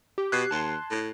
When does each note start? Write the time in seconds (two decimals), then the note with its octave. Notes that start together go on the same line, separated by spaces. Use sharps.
0.18 G4
0.32 B2 F#6 G#6 C7
0.51 D#2 A5 C6
0.91 A2